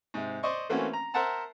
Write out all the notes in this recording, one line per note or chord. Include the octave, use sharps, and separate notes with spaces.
G#2 C3
C5 D5 D#5 C#6
E3 A3 A#3 C4 C#4 F#4
A#5
A#4 C5 E5 F#5 A5 A#5